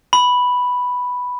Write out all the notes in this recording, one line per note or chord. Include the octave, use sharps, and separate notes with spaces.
B5